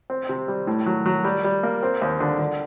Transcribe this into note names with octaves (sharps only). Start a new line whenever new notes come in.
C4
C3
G3
A2
F#3
F#3
G3
G3
A#3
C4
D#2
D3
D3